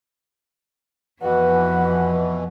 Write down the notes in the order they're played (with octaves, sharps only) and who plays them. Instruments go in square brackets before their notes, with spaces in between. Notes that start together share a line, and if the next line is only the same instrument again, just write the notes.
[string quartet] F2 [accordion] B2 E3 [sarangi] F#4 [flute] B4